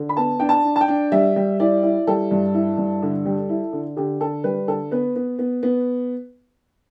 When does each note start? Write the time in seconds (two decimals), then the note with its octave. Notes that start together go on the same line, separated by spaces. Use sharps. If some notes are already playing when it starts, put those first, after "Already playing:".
Already playing: D3
0.09 B5
0.17 B3 A5
0.40 D4 G5
0.49 A5
0.64 D4
0.76 A5
0.81 G5
0.88 D4
1.12 G3 E5
1.36 G3
1.60 E4 D5
1.83 E4
2.07 G3 A4
2.31 G2
2.54 E4
2.78 G2
3.02 D3
3.26 G3
3.49 E4
3.73 D3
3.97 D3 G4
4.20 D3 A4
4.44 G3 B4
4.67 D3 A4
4.91 B3 B4
5.16 B3
5.39 B3
5.63 B3